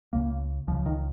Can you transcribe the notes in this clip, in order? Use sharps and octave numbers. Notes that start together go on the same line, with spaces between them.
C#2 C#3 A#3
C#2 C#3 F3
D#3